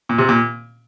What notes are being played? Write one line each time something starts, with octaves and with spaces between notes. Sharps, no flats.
A#2
C3
A#2